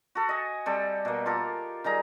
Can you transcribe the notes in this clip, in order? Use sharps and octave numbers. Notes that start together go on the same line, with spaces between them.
F#4 A4
D#5 G#5
G3 C4 G4 A4
B2 A#3
F4 G4 A4 A#4
D#3 G3 G#4 A#5